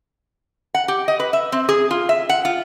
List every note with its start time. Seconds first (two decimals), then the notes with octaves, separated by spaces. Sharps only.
0.74 F#5
0.88 G4
1.08 D#5
1.20 B4
1.33 E5
1.52 C4
1.69 G#4
1.91 F4
2.09 E5
2.29 F#5
2.45 F4